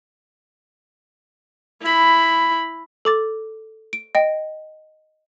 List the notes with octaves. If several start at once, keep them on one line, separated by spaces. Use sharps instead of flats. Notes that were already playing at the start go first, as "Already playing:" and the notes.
E4 B5
A4 D6 A6
D7
D#5 G5